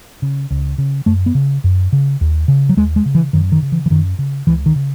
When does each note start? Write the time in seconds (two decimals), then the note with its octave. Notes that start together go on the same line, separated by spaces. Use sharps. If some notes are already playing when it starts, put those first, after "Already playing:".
0.22 C#3
0.51 C#2
0.78 C#3
1.06 F#2 A3
1.26 B3
1.35 C#3
1.64 F#2
1.92 C#3
2.21 D#2
2.48 C#3
2.69 F#3
2.76 D#2 G#3
2.96 G#3
3.06 C#3
3.15 E3
3.33 F#2 D#3
3.52 D#3
3.62 C#3
3.72 E3
3.86 E3
3.90 F#2 D#3
4.19 C#3
4.47 C#2 E3
4.66 D#3
4.76 C#3